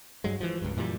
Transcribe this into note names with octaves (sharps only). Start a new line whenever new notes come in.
G2 F#3 G#3
E3 F3
C#2 G2
F#2 A#2 E3 G3